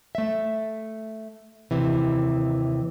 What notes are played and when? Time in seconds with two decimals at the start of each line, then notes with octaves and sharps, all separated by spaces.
0.15 A3 E5
1.71 D#2 C3 E3